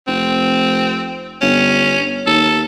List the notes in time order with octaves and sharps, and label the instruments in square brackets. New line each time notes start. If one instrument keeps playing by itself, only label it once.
[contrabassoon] F1 [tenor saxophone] C4
[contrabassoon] G1 [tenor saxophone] C#4
[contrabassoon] D#2 [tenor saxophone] A4